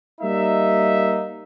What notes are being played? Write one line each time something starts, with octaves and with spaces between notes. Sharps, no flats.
G3 A#3 D#4 E5